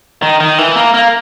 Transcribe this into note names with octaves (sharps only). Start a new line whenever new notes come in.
D#3
D#3
E3
A#3
A#3